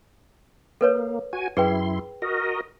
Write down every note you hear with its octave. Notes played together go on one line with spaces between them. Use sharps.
A#3 A4 B4 C#5
F#4 G#5
F#2 E4 G#4 B4 G5 C6
F#4 A#4 D#5